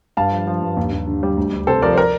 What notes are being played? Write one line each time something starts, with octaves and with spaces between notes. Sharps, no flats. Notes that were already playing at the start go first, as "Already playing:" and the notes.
G2 F5 A5
F3
F3
G2
D#2
D#2
D3
G3
D2
D2
C3 A4 C5
F3 A#4 D5
C5
A#4 D5